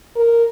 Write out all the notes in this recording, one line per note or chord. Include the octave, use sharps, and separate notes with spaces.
A#4